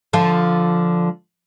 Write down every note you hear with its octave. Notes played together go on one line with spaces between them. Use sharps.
D3 F3